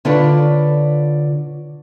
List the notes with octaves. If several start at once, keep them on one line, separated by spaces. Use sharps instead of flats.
D3 D4 F4 B4 C#5